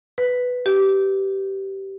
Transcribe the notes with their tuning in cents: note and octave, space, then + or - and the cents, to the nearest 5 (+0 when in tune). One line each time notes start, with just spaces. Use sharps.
B4 +5
G4 -15